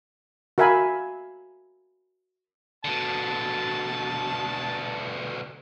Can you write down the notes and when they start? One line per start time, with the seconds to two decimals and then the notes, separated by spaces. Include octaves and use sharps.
0.58 F#4 A#4 E5 F5 G#5 B5
2.85 B2 D3 A5